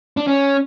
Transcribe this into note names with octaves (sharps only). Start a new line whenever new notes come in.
D4
C#4